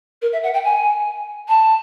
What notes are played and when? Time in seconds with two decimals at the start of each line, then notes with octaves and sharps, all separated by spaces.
0.22 A#4
0.32 E5
0.43 F#5
0.53 G5
0.64 G#5
1.48 A5